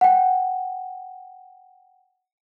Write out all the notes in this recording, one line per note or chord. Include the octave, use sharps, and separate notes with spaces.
F#5 G5